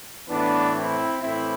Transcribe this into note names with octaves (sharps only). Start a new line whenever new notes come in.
A2 E3 B3 D4
C4 E4
A2 E3 C4 E4